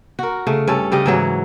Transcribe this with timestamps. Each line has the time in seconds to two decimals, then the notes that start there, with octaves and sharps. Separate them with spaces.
0.19 F#4 A#4
0.47 C#3 A3
0.68 G2 C#4 A4
0.92 C#3 G3 G4 D#5
1.06 G#2 E3 F#3